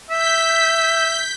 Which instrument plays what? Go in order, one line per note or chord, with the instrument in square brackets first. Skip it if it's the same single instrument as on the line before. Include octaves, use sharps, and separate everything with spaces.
[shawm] E5 [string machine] G6 B6